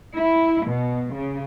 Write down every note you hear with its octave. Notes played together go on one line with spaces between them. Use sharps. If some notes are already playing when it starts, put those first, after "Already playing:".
E4
B2
C#3